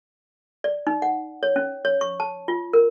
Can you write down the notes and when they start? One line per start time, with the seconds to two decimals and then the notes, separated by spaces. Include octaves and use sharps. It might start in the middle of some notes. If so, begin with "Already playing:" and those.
0.64 D5
0.87 D#4
1.02 F#5
1.43 C#5
1.56 C#4
1.85 C#5
2.01 C#6
2.20 A5
2.48 F4
2.73 A#4